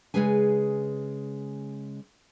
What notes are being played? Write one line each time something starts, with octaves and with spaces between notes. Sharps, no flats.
C#3 F3 G#3 G#4 B4 G#5